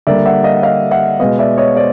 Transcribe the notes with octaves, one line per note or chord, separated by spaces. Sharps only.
D3 G3 A#3 D5 E5
E5 F#5
D#5 F5
F#5
D#5 F5
E5 F#5
B2 G#3 B3 D#5 F5
D5 E5
C#5 D#5
C5 D5